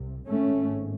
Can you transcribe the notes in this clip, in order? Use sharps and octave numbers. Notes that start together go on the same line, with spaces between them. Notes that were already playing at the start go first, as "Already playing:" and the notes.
Already playing: C2 C3
G#1 G#2 A3 C#4